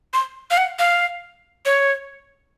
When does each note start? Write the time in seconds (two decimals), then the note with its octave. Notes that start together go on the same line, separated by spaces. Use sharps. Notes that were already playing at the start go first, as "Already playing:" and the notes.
0.14 C6
0.51 F5
0.57 F#5
0.79 F5
1.66 C#5